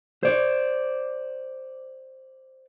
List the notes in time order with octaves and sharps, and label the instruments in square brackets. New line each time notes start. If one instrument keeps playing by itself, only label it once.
[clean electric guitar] C5 D5